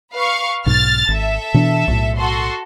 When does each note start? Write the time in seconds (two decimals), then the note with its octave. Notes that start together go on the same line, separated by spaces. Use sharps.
0.13 B4 F5 C#6
0.66 B1 G#2 B2 F6 A6
1.08 G#1 A4 E5
1.54 B2 E3 D4
1.88 B1 A2
2.18 F#4 A4 C6